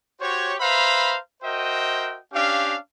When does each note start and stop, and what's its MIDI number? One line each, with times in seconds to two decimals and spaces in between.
0.20 0.53 66
0.20 0.53 67
0.20 0.53 72
0.20 0.53 73
0.60 1.17 71
0.60 1.17 72
0.60 1.17 76
0.60 1.17 77
0.60 1.17 82
0.60 1.17 83
1.42 2.18 66
1.42 2.18 70
1.42 2.18 72
1.42 2.18 75
1.42 2.18 76
1.42 2.18 79
2.33 2.76 61
2.33 2.76 62
2.33 2.76 67
2.33 2.76 77